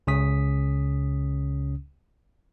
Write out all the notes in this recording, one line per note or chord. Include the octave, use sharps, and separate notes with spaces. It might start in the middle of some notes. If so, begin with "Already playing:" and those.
C#2 C#3 C#4 D#6 B6